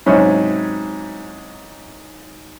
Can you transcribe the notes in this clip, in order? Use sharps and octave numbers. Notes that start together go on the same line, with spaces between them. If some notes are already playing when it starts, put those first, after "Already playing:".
G#2 C3 F#3 C#4 E4